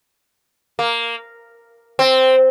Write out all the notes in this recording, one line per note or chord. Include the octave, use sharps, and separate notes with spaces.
A#3
C4